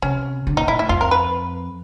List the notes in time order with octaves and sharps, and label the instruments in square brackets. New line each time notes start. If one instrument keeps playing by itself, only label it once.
[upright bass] C3 [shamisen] C#4
[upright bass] D3
[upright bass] A#2 [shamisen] D#4
[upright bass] A#2 [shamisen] E4
[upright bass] A2 [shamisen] E4
[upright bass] F2 [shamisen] F4
[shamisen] A#4
B4